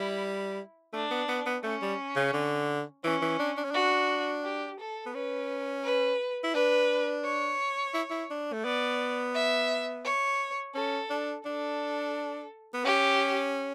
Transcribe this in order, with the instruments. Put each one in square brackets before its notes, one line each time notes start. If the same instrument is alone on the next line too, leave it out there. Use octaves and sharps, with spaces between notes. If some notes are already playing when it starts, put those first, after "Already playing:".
Already playing: [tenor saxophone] G3 [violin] E4
[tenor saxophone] A3 [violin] D4
[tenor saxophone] B3
B3
B3
[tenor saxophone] A3 [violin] C#4
[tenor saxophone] G3
C#3
D3
[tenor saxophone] E3 [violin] C#4
[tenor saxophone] E3
D4
D4
C#4
[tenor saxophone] D4 [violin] F#4
[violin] G4
A4
[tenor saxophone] B3
[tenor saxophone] C#4 [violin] B4
[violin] B4
[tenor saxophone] E4
[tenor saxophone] D4 [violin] B4
[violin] C#5
[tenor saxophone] E4
E4
D4
A3
[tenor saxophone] B3 [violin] D5
[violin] E5
C#5
[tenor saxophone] C#4 [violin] A4
[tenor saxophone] D4
[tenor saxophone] D4 [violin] A4
[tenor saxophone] B3
[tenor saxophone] C#4 [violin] G4